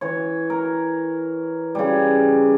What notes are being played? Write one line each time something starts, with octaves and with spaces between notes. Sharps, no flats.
E3 C#5
A#4
C#3 G3